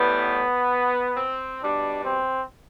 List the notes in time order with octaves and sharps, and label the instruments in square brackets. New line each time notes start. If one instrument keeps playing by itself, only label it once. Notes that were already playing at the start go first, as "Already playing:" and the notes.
Already playing: [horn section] A2 E3 G3 B3
C4
B2 G3 D4
C4